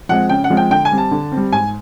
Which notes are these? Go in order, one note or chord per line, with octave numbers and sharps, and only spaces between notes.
F3 G#3 C4 F#5
C#3 G5
F#5
F3 G#3 C4
G5
D3 G5
G#5
G3 C4
A5
D3
C4
G3
G#2 G#5